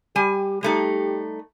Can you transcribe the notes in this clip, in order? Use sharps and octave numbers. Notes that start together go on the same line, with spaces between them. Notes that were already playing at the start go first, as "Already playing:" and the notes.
G3 G4 G#5
G3 A3 D#4 G4